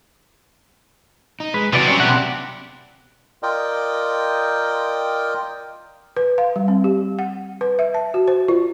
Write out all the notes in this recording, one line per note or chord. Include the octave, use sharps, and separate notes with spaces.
D#4
G#3 B4
C3 E3 F#3 B3 D5
D3 G3 C#4
B2 D4 E4 G4 F#5
F4 A#4 D5 D#5 G5
B4
F5
G3
C4
G4
F#5
B4
E5
A5
F#4
C5
F4